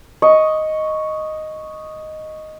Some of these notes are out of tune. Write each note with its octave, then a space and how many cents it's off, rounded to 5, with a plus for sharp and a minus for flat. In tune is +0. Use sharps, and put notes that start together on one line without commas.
D#5 +0 C#6 +0